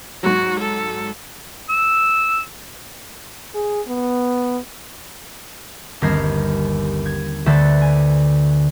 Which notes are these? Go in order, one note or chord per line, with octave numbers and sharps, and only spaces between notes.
G#2 F#3 F#4
A4
E6
G#4
B3
G1 D#2 C4 A#4 G#6 C7
G#6
D2 D3 B4 C5 E5 A6
G#5